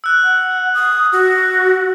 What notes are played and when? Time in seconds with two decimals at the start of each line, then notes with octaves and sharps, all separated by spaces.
0.04 E6 F#6
0.23 F#5
0.74 D#6
1.12 F#4